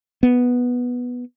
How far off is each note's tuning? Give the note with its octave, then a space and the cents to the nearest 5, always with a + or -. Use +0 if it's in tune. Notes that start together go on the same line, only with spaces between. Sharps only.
B3 -5